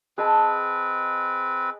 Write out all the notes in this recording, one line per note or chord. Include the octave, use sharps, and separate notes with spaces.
C4 G#4 B4 D#5 A5